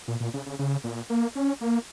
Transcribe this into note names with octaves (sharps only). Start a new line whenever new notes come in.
A#2
A#2
C#3
C#3
C#3
A#2
A#3
C#4
A#3